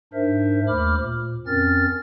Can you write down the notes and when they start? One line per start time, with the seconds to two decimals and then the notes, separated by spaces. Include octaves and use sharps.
0.13 G#2 D4 A#4 C5 E5
0.68 D#2 A3 C5 B5 D6 F6
0.99 A#2
1.47 F2 C4 C#4 A#4 F6 A6